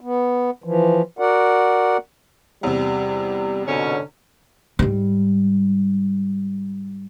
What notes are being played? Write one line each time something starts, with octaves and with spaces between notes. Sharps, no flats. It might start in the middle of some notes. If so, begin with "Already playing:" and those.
B3
E3 F3
F#4 A#4 D5 F#5
E2 C3 G3
G#2 B2 D3 C#4
G#2 G3